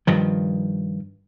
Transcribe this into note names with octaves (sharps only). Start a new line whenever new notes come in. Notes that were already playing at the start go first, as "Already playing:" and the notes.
G2 D#3 F3